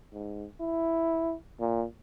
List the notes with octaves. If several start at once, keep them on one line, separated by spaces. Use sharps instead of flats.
G#2
E4
A#2